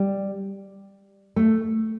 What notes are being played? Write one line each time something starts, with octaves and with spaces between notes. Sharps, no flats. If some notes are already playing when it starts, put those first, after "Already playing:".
Already playing: G3
A3